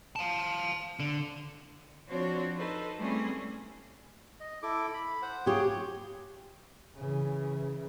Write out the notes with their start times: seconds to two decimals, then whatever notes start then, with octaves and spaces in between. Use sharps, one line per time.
0.16 F5 A5
1.00 D3
2.08 F3 C4 D4 F#4 C5 C#5
2.56 D#4 A4 B4 C5
2.97 G3 A3 C4 C#4 E4 G#4
4.40 D#5
4.63 E4 A4 D6
4.94 B5
5.22 C5 F#5
5.46 F4 G4 G#4 C#5
6.96 C#3 E3